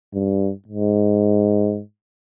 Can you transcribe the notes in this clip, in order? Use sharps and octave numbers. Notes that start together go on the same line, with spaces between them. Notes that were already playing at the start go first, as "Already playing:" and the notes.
G2
G#2